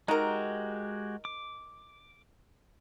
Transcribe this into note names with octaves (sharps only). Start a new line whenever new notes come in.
G#3 D#4 F#4 G4 A#4
D6